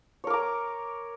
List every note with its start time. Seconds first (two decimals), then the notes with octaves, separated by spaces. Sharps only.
0.24 C#5
0.27 A#4
0.30 D6
0.33 A#5